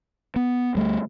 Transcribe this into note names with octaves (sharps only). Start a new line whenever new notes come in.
B3
D2 G3 A3